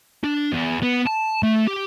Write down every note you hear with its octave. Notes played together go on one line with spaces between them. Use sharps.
D4
E2
B3
A5
A3
G4